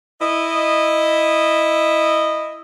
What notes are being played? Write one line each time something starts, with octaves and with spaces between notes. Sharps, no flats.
E4 D#5